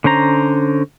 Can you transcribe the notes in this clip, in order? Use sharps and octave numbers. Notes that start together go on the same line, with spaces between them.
D3 C#4 C5 A#5